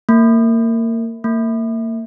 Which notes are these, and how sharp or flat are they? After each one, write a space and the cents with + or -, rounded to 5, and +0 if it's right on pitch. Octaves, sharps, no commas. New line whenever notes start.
A#3 -25
A#3 -30